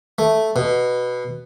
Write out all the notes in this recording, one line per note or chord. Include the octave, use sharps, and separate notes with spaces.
A3
B2